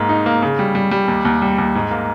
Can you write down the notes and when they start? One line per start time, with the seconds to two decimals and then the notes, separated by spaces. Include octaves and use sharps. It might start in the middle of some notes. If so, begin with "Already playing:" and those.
Already playing: G#2 A#3
0.09 D#4
0.26 A#3
0.42 C#3
0.59 G3
0.75 G3
0.91 G3
1.08 D#2
1.25 D#2
1.42 G3
1.58 D#2
1.75 G#2
1.91 A#3